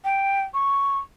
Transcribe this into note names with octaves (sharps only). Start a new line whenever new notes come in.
G5
C#6